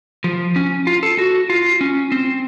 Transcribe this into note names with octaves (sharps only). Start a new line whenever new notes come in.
F3
C#4
F4
A4
F#4
F4
C#4
C4